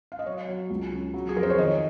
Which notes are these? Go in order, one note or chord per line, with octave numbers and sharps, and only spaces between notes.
F5
D#5
F#3 C#5
F#3
C#2
C#3
F#3
G#4
F2 A#4
C5
C#5
D#3 D#5